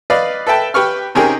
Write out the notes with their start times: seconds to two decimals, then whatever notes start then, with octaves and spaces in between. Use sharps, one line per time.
0.10 B4 D5 D#5 F5
0.47 A4 B4 E5 G5 A5
0.74 G4 B4 C#6 F6
1.15 C3 C#4 D#4 G4 G#4 A#4